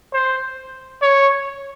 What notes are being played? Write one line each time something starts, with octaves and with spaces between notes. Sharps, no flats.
C5
C#5